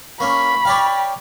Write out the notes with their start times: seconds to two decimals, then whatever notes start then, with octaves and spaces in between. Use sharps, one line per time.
0.20 A#3 C#4 B5 C#6
0.65 C#5 D5 F5 G5